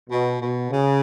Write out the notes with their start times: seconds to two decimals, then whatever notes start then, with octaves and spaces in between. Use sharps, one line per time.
0.10 B2
0.40 B2
0.71 C#3